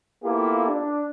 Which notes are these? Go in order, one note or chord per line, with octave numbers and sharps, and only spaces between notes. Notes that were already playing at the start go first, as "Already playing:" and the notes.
A#3 B3 E4 F4 G4 A4
D4